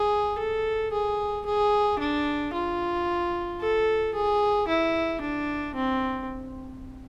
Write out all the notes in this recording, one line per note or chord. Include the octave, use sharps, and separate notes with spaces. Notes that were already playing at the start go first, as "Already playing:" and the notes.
Already playing: G#4
A4
G#4
G#4
D4
F4
A4
G#4
E4
D4
C4